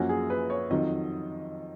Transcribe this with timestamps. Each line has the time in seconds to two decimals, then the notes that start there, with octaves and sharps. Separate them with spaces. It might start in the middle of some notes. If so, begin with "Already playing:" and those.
Already playing: F#2 F3 A#3 C#4 F#4
0.09 G#4
0.30 B4
0.50 C#5
0.70 F2 D#3 F#3 D#5